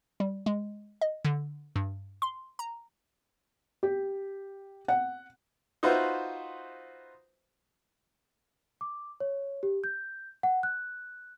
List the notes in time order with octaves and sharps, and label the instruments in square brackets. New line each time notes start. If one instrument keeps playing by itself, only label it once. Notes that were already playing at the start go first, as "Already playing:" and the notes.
[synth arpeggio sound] G3
G#3
D#5
D3
G2
C6
A#5
[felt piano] G4
F#5
[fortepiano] D#4 F4 F#4 B4 C5 E5
[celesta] D6
C#5
G4
G6
F#5
F#6